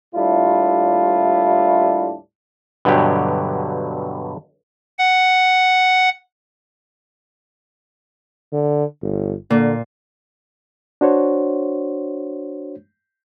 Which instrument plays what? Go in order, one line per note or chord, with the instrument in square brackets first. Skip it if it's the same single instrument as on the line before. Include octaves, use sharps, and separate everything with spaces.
[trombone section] D#2 A2 G3 D4 E4 F4
[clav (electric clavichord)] G2 B2 D3 F#3 G4
[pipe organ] F#5
[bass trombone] D3
G1
[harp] A#2 [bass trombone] D3
[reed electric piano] D4 F#4 C5 C#5